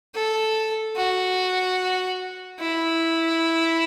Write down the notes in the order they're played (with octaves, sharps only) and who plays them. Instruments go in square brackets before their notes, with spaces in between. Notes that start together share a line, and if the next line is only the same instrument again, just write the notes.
[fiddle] A4
F#4
E4